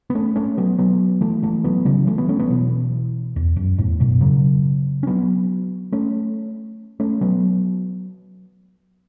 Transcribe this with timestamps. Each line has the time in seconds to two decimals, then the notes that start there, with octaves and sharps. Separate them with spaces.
0.10 B3
0.15 A3 C#4
0.36 A3 C#4
0.57 F#3 B3
0.79 F#3 B3
1.21 E3 A3
1.43 E3 A3
1.64 F#3 B3
1.85 C#3 F#3
2.07 E3 A3
2.18 F#3 B3
2.29 A3 C#4
2.39 F#3 B3
2.50 B2 E3
3.36 E2
3.57 F#2
3.78 E2 A2
4.00 F#2 B2
4.21 C#3 F#3
5.03 C#4
5.07 F#3 B3
5.92 A3 C#4
7.00 A3 C#4
7.21 F#3 B3